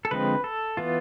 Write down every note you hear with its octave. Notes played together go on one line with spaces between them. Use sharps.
A4
D3 F3 G#3 C4 B4
A4
E3 B3 F4